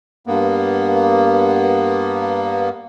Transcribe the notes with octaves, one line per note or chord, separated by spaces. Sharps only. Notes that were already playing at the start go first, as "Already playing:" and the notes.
G2 A#3 B3